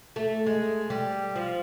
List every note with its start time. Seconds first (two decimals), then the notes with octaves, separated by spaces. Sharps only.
0.16 A3
0.46 G#3
0.90 G3
1.35 F3